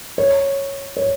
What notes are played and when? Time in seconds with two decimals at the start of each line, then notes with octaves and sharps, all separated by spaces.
0.18 C#5
0.97 C#5